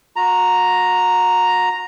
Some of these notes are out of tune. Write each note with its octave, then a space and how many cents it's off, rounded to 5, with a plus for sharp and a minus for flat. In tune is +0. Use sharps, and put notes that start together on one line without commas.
F#4 -35 A#5 +0